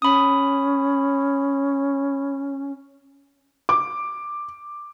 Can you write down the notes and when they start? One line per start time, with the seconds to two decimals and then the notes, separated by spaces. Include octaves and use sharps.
0.02 C#4 B5 D#6
3.69 D6